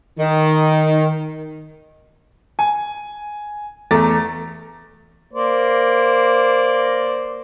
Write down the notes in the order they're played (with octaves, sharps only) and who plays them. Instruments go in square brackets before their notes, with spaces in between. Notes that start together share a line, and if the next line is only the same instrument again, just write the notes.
[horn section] D#3
[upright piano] G#5
E2 A3 A#5 D6 A6
[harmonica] A#3 C5 D5